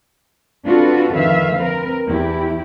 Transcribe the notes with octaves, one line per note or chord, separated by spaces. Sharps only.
C4 D4 F4 F#4 A4 B4
F2 D3 D#3 B4 E5 F5
C4 A#4 B4
E2 E4 G4